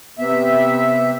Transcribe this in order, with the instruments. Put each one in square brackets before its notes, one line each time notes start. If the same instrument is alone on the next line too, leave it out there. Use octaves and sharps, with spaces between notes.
[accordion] C3 E5 [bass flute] B3